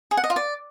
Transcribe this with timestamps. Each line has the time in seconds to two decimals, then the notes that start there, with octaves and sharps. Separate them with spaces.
0.11 G#4
0.17 F#5
0.24 D#5
0.30 F4
0.36 D5